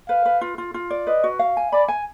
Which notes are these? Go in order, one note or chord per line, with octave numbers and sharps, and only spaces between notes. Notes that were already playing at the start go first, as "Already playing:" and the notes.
B4 F5
B4
F4
F4
F4
D5
B4 D#5
F#4
F5
G#5
D5 B5
G#5